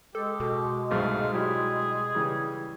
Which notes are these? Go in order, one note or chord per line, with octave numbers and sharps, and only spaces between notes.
G#3 G4 A4
B2
C2 G#2 A3 F5
F#3 G3 E4 G#4
C#3 E3 G3